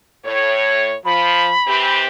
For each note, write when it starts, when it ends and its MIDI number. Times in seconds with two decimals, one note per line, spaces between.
0.25 0.93 45
0.25 0.93 73
1.05 1.50 53
1.05 1.99 83
1.66 2.08 52
1.66 2.08 60
1.66 2.08 67